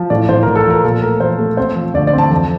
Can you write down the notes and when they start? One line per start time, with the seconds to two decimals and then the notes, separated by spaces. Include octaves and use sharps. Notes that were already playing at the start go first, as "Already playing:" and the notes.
Already playing: F3
0.10 A2 D5
0.29 A2 C5
0.43 A2 A#4
0.55 A4
0.66 F3 A#4
0.84 A#2 A4
1.02 A3 A#4
1.20 F3 C5
1.39 A3
1.57 C4 C5
1.76 F3
1.94 D2 D5
2.07 D5
2.13 C4 A5
2.31 F2 A5